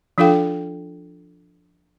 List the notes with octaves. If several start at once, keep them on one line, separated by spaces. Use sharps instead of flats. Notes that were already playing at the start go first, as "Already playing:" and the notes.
F3 D4 F4 A4 F5 G5